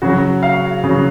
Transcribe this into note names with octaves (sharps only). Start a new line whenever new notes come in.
C#3 F#3 F#4
F5
C#3
F#3